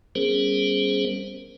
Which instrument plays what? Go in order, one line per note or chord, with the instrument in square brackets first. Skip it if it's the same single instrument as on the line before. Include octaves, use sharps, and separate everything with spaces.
[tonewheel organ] G3 B3 C#4 G#4 A#4 C5